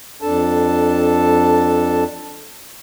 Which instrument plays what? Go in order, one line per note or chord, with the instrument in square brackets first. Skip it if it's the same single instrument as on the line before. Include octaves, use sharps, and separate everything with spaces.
[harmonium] F2 D4 A4 A5